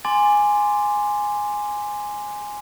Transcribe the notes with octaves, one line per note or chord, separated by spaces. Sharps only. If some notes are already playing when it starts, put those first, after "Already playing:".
G#5 C6 D6 A6